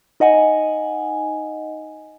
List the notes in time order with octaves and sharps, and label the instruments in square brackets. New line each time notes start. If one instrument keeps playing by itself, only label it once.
[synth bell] D#4 D#5 F#5 G#5